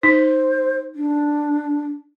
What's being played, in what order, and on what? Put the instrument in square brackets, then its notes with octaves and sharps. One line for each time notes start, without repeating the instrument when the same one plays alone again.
[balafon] D#4 [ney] C5
[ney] D4